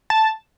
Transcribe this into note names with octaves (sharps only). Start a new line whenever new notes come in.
A5